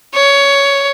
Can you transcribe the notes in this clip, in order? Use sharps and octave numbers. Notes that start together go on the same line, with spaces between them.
C#5